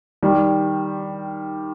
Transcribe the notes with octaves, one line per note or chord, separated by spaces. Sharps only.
D#3 G3